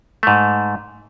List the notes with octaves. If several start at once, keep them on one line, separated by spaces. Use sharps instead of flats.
G#2 A3